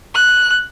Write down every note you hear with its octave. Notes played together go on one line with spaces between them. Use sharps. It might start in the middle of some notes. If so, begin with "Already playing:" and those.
F#6